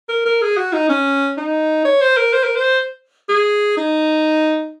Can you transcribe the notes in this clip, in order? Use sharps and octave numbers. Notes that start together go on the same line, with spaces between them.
A#4
A#4
G#4
F#4
D#4
C#4
D#4
C#5
C5
A#4
C5
A#4
C5
G#4
D#4